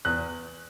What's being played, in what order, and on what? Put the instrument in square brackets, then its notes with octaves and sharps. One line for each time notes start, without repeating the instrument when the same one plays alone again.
[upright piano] E2 F#6